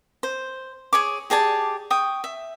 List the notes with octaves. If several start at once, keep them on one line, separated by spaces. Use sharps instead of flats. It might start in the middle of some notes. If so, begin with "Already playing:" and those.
C5
G#4 C#5 D6
G4 G#4 D5 A5
G5 C#6 D#6
E5